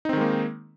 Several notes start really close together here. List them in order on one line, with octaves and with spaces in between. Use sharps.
D#4 C4 D#3 G#3 A#3